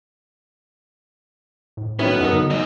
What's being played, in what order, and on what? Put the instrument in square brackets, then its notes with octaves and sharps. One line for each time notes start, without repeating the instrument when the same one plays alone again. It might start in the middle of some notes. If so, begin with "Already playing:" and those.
[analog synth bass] A2
[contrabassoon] B1 [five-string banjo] D#3 C#4 E4 [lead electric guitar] B3
[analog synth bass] F#2 [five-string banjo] F#3 D#4 A#4
[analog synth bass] D3
[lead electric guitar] G#2 D#5 [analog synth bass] G3